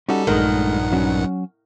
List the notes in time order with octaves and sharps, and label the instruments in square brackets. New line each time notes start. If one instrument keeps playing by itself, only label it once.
[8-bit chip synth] G3 A4 [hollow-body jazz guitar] C#4 D#4 F#4
[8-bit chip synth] A#1 G2 F#5 [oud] D#3 [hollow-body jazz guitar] G#3 A3 G#4
[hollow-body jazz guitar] F#3 C#4 F#4